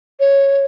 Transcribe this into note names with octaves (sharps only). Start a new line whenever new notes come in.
C#5